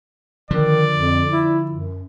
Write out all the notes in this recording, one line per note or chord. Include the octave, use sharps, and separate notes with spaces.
D3 D#3 F3 D5
F2
E4
F#2